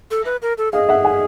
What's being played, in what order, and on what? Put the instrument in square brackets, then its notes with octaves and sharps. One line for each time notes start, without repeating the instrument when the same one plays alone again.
[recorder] A4
B4
A#4
A4
[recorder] G#4 [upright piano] D#5 F5
[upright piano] E5 F#5
F#5 G#5